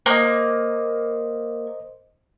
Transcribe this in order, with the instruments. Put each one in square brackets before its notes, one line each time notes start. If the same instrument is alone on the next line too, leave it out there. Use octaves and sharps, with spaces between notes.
[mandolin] A#3 [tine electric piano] C5 D#5